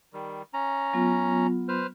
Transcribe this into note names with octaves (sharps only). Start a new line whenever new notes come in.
D#3 G3
C#4 A#5
F#3 B3 F4
B4 C5 F6